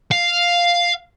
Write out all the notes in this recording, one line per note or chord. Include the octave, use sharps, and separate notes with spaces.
F5